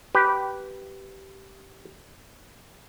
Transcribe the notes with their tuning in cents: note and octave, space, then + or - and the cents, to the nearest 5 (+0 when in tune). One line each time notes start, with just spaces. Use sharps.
G4 -15 B4 +0